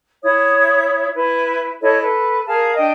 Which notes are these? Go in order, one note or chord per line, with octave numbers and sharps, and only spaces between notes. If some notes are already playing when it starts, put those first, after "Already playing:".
E4 C#5 E5 D#6
E4 B4
E4 A4 C#5 D#5
A4 B4
G#4 A#4 F5 A5
D4 D#5 G5